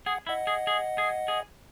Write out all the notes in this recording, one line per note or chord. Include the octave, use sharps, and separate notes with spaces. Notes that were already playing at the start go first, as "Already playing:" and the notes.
G#4 F#5
E4 D#5 F#5
G#4
G#4
G#4
G#4